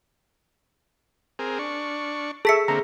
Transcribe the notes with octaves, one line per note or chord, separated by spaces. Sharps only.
C4 G#4 A#4
D4 C#6
G#4 A4 E5 B6 C#7
D3 A#3 C4 A#5